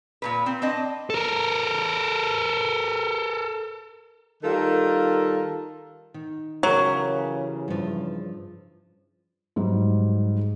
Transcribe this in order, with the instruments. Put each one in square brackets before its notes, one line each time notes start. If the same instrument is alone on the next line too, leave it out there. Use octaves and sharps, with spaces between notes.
[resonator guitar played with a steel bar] A#2 E3 B4
C4
C4 D4 D#5
[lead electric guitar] A4 A#4
[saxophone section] D#3 G3 F4 A4 A#4
[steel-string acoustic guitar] D#3
[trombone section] C#3 E3 [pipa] F#3 [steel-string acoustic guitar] G4 G#4 A#4
[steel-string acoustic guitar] G2 F3
[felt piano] G#2 F#3 G3